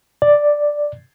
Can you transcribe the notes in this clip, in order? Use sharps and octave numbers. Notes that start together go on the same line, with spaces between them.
D5